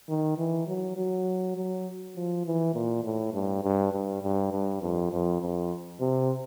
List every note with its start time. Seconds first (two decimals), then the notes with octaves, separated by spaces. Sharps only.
0.09 D#3
0.38 E3
0.67 F#3
0.97 F#3
1.57 F#3
2.16 F3
2.46 E3
2.74 A#2
3.04 A2
3.34 G2
3.64 G2
3.93 G2
4.22 G2
4.52 G2
4.82 F2
5.12 F2
5.41 F2
6.01 C3